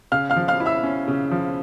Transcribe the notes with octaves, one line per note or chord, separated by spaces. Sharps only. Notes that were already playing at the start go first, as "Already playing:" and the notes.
C#3 F5 F6
F5 F6
F3
F5 F6
E4
E5 E6
C#4
C#3
F3